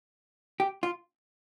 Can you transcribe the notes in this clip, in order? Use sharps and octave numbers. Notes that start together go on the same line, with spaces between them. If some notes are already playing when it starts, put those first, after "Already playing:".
G4
F4